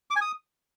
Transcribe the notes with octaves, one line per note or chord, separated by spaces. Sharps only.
D6
G#5
D#6